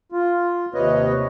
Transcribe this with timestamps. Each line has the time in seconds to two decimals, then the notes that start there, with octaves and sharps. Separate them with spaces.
0.12 F4
0.74 D#2 C3 B4 C#5 D#5